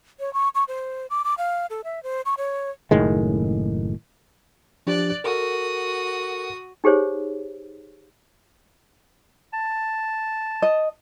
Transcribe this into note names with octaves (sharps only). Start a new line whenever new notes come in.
C#5
C#6
C#6
C5
D6
D6
F5
A4
E5
C5
C#6
C#5
F#1 A2 D#3 G#3
F3 D4 G4 D5 F#6
F#4 A4 A#4 D#6
D#4 G4 G#4 C5 C#5
A5
D#5